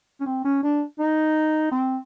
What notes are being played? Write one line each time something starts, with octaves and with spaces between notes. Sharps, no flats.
C#4
C4
C#4
D4
D#4
C4